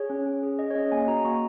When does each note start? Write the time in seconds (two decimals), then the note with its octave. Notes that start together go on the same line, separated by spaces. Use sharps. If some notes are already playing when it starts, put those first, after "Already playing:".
Already playing: G#4 C#5
0.10 C#4
0.26 C#4
0.43 G#4
0.59 G#4 D#5
0.71 C#5
0.75 C#4 D#5
0.92 A#3 G#5
1.07 F#4 A#5
1.24 A#3 C#6